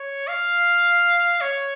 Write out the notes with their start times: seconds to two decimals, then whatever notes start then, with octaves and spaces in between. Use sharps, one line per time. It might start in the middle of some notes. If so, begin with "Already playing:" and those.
Already playing: C#5
0.28 F5
1.41 C#5